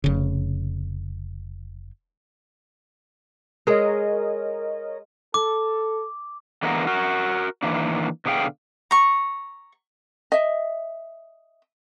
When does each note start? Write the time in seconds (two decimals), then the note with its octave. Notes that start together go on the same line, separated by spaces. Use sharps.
0.04 F1 C#3
3.67 G#3 G#4 A#4 C#5 D#5
5.34 A4 D6
6.63 D3 E3 G#3 A#3 B3 A#4
6.87 F#4 A#4
7.63 D#3 E3 A#3 D4
8.26 B2 D3 G#4 F5 G5
8.91 A#5 C#6
10.32 D#5 E5